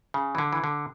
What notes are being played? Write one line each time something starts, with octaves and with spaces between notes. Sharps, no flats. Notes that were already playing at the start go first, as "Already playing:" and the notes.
C#3
E3
D3
E3
D3